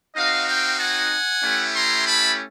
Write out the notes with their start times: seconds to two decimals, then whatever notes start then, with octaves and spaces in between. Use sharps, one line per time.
0.15 C4 D#4 F#4 D#5 F5
0.47 F5 G5
0.79 F#5 G#5
1.42 A3 C#4 E4 G4
1.74 A#5 C6
2.06 A5 B5